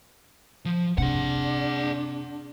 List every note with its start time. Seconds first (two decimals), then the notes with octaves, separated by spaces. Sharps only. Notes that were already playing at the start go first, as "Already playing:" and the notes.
0.65 F3
0.98 C3 D4 G#4 F#5